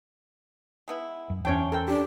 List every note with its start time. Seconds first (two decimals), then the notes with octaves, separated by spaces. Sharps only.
0.88 G#3 B3 E4
1.30 F#2
1.45 E2 C#4 D4 E4 C5 C#5 G5
1.72 A4 A#4 C5 G5
1.88 D4 G4